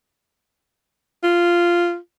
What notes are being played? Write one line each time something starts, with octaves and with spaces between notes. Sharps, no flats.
F4